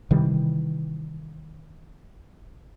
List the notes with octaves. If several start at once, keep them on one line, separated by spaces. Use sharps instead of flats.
C3 D#3 E3 G3